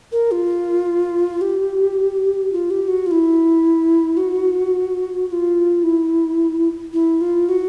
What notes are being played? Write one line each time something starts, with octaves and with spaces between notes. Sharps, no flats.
A#4
F4
G4
F4
G4
F#4
F4
E4
F#4
F#4
F4
E4
E4
F4
F#4